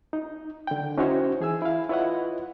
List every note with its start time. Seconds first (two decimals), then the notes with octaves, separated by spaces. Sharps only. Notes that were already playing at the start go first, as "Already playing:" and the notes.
0.13 D#4
0.67 D3 G5
0.98 C#4 D#4 E4 F#4 C5 C#5
1.41 E3 G#4 G#5 E6
1.62 E4 F5
1.89 E4 F4 B4 C#5 D#5 F#5